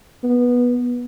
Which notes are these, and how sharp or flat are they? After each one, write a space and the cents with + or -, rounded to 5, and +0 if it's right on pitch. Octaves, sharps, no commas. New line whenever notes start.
B3 -15